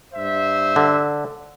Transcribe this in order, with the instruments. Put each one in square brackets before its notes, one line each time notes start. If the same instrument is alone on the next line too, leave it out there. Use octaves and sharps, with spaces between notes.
[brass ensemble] G2 C5 E5
[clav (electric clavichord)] D3